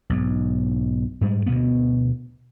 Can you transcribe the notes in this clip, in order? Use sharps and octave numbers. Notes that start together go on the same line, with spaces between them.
B1 G#2
G#2 G3 G#3
D2 B2 A#3 B3